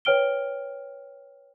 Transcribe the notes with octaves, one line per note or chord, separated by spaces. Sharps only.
B4 C#5 G5 F6 D7 G7